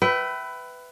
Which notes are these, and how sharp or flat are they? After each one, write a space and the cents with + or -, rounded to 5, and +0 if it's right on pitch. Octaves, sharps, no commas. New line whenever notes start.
B4 +15 E5 +5 G5 -30